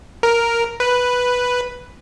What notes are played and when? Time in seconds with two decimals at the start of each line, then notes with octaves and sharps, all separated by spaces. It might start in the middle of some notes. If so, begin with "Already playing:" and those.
0.23 A#4
0.80 B4